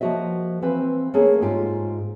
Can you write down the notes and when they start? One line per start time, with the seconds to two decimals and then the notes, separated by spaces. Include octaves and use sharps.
0.01 F3 A#3 F#4 D#5 E5
0.62 E3 C4 B4 F5
1.14 A3 A#3 C#4 G#4
1.42 G#2 F4 G4